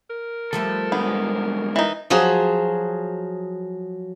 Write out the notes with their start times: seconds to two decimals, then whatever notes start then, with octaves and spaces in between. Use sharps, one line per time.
0.10 A#4
0.53 F3 G3 A3 A4
0.92 G#2 D3 B3
1.76 E3 D#4
2.10 F3 F#3 F#4 G#4